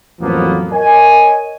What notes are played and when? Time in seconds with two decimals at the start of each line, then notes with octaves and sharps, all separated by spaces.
0.20 A1 F2 F3 F#3 A#3 B3
0.71 A#4 C#5 D#5 G#5